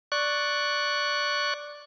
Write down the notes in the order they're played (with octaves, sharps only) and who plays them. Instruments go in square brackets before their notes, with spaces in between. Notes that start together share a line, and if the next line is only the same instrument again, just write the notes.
[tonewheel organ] D5 C#6 F#6